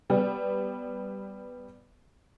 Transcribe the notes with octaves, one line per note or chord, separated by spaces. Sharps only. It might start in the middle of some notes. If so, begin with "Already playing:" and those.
G3 B3